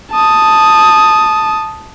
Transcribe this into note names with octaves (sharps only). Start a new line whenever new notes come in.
A5 D#6